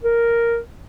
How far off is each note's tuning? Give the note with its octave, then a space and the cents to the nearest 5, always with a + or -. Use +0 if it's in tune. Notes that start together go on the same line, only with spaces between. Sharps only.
A#4 +0